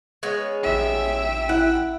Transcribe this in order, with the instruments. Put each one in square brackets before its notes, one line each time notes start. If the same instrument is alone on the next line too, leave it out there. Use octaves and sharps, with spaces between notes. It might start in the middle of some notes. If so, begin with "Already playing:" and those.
[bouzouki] G#3 B3 C#4
[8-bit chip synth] A1 G5 [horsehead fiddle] E5
[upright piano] E4 [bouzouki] F#5